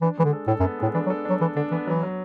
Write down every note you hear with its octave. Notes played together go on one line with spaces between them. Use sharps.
E3 D4
E3 G#3
D3
A4
A2 A4
F#2
B3
A2 G#3
E3 D4
F#3
A4
F#3 D4
E3 A4
D3 D4
E3 B3
E3 F#3
F#3